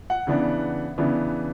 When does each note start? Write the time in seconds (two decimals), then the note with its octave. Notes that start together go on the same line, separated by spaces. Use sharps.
0.10 F#5
0.27 C#3 E3 B3 D4
0.98 C#3 E3 B3 D4